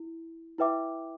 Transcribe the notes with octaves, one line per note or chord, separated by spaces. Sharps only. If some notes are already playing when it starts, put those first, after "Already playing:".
Already playing: E4
E4 B4 E5 G5 D6